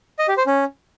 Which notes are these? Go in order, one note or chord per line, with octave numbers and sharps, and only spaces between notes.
D#5
G4
C5
C#4